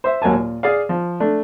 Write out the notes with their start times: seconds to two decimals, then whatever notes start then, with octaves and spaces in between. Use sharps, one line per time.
0.04 C5 E5
0.22 D#2 F#3 A#3 G#5 A5
0.33 A#2
0.63 G#4 D5 F5
0.89 F3
1.20 A3 D4